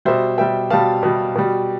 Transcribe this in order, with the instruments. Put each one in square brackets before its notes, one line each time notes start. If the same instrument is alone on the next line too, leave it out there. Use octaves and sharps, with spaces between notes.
[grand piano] B2 G3 C5 E5
B2 G3 E5 G5
B2 G3 F5 A5
B2 G3
B2 G3